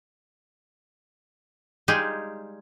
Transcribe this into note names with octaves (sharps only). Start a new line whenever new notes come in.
G3 G#3 D#4 F4 G4 G#4